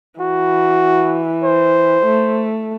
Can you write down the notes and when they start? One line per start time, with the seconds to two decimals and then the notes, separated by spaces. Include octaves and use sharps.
0.20 E3 F#4
1.44 C5
2.06 A3